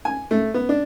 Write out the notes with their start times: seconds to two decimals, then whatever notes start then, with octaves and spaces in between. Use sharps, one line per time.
0.05 G#5
0.31 A3
0.54 B3
0.69 D4